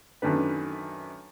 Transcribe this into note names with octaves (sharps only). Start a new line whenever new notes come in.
F#2 D#3 A3 D4 B4